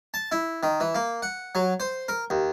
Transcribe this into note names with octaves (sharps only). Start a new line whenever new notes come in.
A5
E4
D#3
E3
A#3
F#5
F#3
C5
A#4
D#2